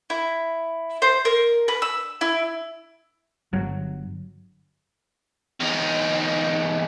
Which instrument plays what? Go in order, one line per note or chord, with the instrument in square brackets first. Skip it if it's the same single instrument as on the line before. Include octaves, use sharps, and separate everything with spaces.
[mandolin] E4
C5
A#4
B4
E6
E4
[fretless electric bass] G1 F#3
[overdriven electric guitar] E2 D#4